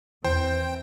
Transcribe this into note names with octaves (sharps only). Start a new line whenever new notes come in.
E2 E3 C4 C5 G5